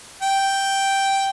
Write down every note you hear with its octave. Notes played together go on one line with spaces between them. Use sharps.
G5